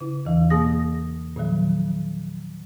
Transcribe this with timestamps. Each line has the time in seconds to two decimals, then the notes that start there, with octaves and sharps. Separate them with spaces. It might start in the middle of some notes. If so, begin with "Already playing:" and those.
0.01 C#3 E4
0.25 E2 E3 F5
0.50 B2 A#3 G#4 D#6 A#6
1.36 A#2 D#3 F3 F#3